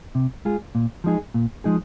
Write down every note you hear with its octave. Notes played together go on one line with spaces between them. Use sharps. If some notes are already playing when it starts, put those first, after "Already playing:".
C3
G#3 F4 G#4
A#2
F3 G#3 D#4 G#4
A#2
F3 G#3 D#4 G#4